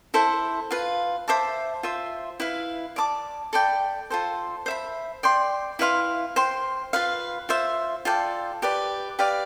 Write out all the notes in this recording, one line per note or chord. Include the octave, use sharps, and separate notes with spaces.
E4 A4 C5
F4 B4 F5
C5 E5 A5 D6
F4 C5 E5
E4 B4 F5
D5 A5 D6
A4 D5 G5 B5
F4 A4 C5
C5 E5 B5
D5 G5 C6
E4 B4 F5 C6
C5 G5 C6
F4 B4 F5
F4 C5 E5
F4 A4 D5 G5
G4 B4 D5
G4 B4 D5 F5